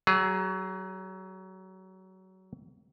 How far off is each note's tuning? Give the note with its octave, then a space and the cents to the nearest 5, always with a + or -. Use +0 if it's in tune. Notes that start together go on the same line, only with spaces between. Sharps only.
F#3 +25 G#4 +0